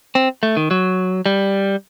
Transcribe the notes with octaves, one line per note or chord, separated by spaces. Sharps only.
C4
A3
D#3
F#3
G3